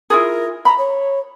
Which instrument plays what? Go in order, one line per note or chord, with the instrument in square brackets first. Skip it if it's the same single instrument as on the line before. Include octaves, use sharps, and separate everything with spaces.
[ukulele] E4 F4 G#4 [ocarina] A#4
[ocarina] A#5 [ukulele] B5
[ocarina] C#5